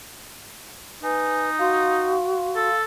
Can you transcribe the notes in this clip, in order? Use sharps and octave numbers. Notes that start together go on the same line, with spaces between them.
D#4 B4 G#5
F#4 F5 C6
A4